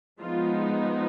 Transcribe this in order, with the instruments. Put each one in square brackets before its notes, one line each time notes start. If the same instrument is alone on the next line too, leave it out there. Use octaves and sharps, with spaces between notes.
[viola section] F3 G#3 B3 D#4 F4